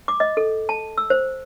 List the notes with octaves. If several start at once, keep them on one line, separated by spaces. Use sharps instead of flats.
D6
D#5
A4
A5
E6
C5